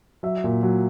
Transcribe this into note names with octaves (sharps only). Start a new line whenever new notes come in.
F#3 E5
A#2
F#3